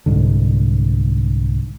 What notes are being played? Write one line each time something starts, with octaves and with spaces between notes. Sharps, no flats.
C2 G#2 D3